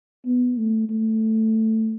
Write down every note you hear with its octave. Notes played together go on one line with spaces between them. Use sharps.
B3
A3
A3